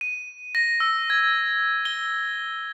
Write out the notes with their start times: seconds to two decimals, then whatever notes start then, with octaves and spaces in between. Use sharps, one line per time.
0.01 D#7
0.55 A#6
0.80 E6
1.10 G#6
1.85 G7